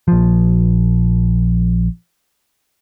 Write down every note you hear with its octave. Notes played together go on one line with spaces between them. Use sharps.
A#1 F3